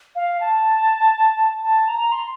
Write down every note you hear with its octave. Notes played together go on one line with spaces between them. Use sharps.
F5
A5
A5
A#5
C6